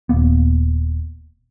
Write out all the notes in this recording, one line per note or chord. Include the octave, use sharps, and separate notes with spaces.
D#1 A#3 B3